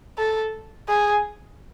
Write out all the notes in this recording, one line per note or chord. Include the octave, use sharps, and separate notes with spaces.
A4
G#4